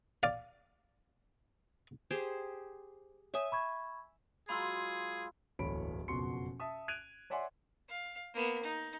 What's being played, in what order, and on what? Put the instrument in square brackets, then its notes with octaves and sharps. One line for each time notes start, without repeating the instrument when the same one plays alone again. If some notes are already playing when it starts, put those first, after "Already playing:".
[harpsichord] D5 F5
[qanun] G4 G#4 C5
[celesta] C#5 D#6 [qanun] E5 G#5
[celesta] B5 C#6 G#6
[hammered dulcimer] F#3 G#3 F4 [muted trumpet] G#4 [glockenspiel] B5 C6 E6
[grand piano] D1 G1 E2 C#5 B5 D7
F#1 F2 B2 F#4 C6 C#7
E5 A5 D#6
F#6 G#6 D7 D#7 F7
C#5 D5 E5 F#5 G#5 C6
[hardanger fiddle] F5
A#3 B3
D#4